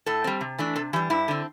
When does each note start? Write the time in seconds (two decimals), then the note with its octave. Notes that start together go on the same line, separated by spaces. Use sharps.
0.06 A2 A4
0.24 G3 C4
0.41 C3
0.59 E3 A3 D4
0.76 C3 A4
0.93 E3 G4
0.96 G3
1.10 G2 E4
1.28 D3 C4